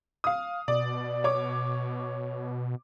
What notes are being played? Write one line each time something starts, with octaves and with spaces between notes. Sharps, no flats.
F5 D#6
B2 D5
C#5 D6